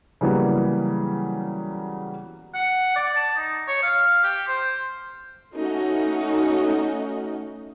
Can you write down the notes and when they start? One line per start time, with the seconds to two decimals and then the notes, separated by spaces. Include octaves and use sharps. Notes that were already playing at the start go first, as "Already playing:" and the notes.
0.21 C#3 E3 F#3 G3 A#3 B3
2.54 F#5
2.96 D5
3.16 A5
3.36 D#4
3.68 C#5
3.83 F5
4.24 G4
4.48 C5
5.54 A3 C#4 D#4 F#4